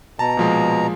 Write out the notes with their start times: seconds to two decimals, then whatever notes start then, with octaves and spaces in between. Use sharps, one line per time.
0.19 B2 A5 A#5
0.37 A#2 F3 G#3